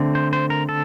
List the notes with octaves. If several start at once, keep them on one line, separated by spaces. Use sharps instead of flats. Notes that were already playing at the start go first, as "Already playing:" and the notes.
Already playing: D3 A3 C4
C5
C5
A#4
A4